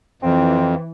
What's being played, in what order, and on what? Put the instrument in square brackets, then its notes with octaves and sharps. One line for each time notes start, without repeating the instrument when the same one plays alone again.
[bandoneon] F2 [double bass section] E3 [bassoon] C4